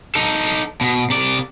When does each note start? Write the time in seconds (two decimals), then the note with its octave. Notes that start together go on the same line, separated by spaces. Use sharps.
0.15 D#4 A4
0.81 B2
1.10 C3 D5